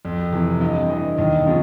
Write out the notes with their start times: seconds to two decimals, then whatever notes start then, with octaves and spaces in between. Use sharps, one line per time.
0.05 F2
0.32 C3 E3
0.61 G2 D#5
0.89 E3 D#5
1.18 D#2 D#5
1.46 C#3 F3